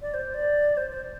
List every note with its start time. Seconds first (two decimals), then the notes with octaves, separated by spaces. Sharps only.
0.02 D5
0.14 C5
0.34 D5
0.77 C5
0.91 C5